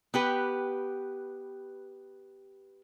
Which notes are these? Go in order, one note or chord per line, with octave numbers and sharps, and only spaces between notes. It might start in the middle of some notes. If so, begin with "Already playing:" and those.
B3 G4 B4